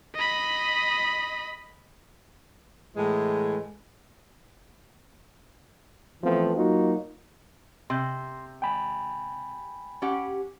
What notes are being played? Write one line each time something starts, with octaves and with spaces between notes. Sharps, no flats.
D#5 B5
A2 E3 G#3
E3 F3 A3 B3 C4
F#3 A#3 D#4 F4 F#4
C3 C6 G6
G5 G#5 B5
C#4 G4 F#5